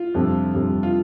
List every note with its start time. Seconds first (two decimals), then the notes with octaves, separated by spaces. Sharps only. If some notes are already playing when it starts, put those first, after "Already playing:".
Already playing: F4
0.14 F2 C3 G3 D4 A4
0.54 F2 C3 G3 D4 A4
0.83 F4